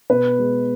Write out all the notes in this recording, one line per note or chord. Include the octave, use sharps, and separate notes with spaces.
B2 B4
G#3